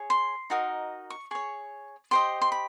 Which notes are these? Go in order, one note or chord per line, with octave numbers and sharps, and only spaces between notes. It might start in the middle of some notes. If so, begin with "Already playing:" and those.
Already playing: G#4 C#5
C6
D#4 F#4 A#4 D#5
C#6
G#4 C#5 C#6
G4 C5 D#5 C6
C6
B5